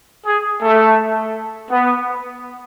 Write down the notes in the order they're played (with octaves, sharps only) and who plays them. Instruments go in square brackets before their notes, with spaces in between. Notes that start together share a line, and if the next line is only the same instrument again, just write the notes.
[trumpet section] G#4
A3
B3